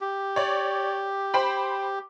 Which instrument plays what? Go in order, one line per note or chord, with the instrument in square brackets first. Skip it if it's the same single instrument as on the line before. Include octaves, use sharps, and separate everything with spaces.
[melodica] G4
[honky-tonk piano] C#5 D5
C5 G5 B5